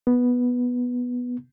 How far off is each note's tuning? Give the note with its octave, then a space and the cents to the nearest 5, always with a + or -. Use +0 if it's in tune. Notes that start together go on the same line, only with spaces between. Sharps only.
B3 -5